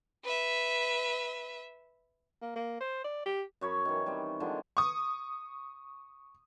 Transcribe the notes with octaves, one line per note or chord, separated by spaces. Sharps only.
B4 E5
A#3
A#3
C5
D5
G4
F#2 C#5 B5
D#3 E3
G3 C4
D3 D#3 F3 G#3
C#6 D#6